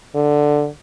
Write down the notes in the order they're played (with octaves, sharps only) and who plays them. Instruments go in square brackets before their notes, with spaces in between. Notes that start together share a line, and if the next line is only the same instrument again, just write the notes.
[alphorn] D3